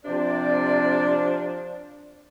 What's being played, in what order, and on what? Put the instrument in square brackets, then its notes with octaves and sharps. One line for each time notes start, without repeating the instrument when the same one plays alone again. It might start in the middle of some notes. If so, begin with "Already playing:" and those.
[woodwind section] C3 D5 [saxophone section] F3 D4